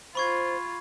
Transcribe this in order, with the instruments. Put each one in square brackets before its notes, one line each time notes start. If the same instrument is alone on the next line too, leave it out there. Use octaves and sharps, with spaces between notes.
[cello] F4 [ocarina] C5 [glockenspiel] B5 C#6 G#6